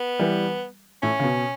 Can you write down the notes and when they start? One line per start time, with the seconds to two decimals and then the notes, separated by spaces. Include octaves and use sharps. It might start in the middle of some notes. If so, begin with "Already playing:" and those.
Already playing: B3
0.19 E3 G3
1.02 A2 C#4
1.19 C#3
1.24 B2